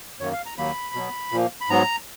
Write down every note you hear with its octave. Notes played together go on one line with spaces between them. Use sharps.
F#2 D#3 A#3 C#5
F5
A#5
D#2 D#3 F#3 A#3 B5
B2 F#3 B3
A#2 F3 A#3
B5
G#2 F#3 B3 A#5